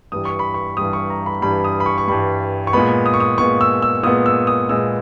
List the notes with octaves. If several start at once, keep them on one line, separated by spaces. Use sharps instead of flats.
G2 E3 G3 D#6
C#6
B5
C#6
G2 E3 G3 D#6
C#6
A#5
B5
G2 E3 G3 B5
D#6
B5
C#6
C#6
G2 E3 G3 B5
C#6
A#2 G#3 B3 B5
D#6
C#6
D#6
A#2 G#3 B3 C#6
E6
E6
A#2 G#3 B3 D#6
E6
D#6
A#2 G#3 B3 E6